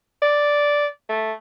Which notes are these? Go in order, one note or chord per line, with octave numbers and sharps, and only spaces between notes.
D5
A3